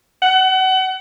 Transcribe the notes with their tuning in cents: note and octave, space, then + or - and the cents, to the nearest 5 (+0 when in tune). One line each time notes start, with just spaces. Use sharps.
F#5 +30